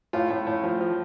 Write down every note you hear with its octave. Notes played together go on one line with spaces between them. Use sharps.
A2 F4
A2
A2
F3
F3